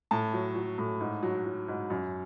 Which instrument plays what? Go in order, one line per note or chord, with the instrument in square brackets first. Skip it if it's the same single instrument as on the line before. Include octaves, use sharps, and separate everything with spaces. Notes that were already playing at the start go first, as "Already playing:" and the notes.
[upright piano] A2 A5
F#3
F#3
A2
G#2
F#3
F#3
G#2
F#2